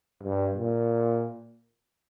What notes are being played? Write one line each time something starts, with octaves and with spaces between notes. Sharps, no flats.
G2
A#2